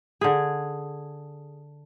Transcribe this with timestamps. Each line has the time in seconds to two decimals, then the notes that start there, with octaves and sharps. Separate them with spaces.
0.21 D3 G#4